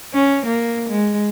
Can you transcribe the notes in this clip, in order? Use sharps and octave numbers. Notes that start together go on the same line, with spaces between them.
C#4
A#3
G#3